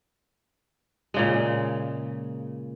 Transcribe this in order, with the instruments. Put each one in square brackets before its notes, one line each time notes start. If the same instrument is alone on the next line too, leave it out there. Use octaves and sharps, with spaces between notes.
[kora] A#2 C#3 G#3